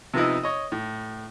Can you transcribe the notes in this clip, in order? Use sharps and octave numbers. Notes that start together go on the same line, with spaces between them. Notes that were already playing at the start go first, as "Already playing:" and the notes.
C3 F3 B3 D#4 E4
C#5 D#5
A2